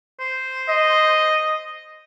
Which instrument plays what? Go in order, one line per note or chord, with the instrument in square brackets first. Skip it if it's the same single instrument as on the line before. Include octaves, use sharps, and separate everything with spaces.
[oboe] C5
[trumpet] D#5